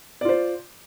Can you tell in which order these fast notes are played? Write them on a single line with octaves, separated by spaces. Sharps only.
D5 F4 C5